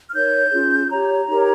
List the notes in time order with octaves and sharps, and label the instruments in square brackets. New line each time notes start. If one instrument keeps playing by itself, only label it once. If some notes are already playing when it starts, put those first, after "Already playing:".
[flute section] F6
D#4 A#4 C#5 G6
C#4 F4 G#4
G4 C#5 A#5
D#4 G4 A#4 C#5